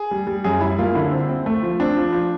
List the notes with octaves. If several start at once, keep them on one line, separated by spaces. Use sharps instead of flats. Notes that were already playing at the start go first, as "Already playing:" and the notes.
Already playing: G#4
G3
G3
F#2 G#4
G3 E4
A#3 F4
D3 E4
C4
C4
A3
F3
C4 D4
F3
F3